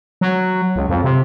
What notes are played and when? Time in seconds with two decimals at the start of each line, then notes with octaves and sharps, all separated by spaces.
0.21 F#3
0.76 C#2
0.89 F2
1.04 C3